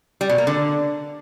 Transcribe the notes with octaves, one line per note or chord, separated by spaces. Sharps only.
G3
B2
A#3
D3